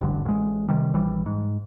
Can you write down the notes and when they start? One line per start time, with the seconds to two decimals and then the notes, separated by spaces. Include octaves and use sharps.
0.01 E1 A1 G2 D3
0.25 A1 G#3
0.69 C3 D#3 G3
0.94 A#1 E3 G3
1.26 G#2